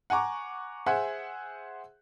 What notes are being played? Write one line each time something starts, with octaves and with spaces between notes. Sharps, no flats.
F#5 G#5 A#5 C#6 D6
G#4 C5 E5 F#5 G#5